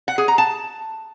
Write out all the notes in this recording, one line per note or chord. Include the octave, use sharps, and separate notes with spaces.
F#5
G#4
A#5
A5